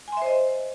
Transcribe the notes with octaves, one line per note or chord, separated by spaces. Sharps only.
C5 D#5 E5 G#5 C6